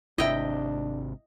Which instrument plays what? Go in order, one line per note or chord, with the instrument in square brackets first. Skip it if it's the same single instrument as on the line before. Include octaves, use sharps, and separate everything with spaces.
[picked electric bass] G#1 C3 [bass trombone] D4 [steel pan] E4 E5 [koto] D#5 G5